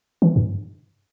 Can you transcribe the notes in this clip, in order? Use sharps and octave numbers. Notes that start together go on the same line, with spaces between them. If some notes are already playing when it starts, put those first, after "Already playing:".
E3
G2